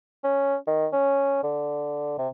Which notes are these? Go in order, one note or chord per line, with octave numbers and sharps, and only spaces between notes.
C#4
D#3
C#4
D3
C3